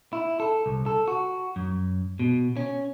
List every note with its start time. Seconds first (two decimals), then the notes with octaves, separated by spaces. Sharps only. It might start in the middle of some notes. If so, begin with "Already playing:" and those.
0.13 E4
0.40 A4
0.66 C2
0.86 A4
1.08 F#4
1.56 F#2
2.19 B2
2.57 C#4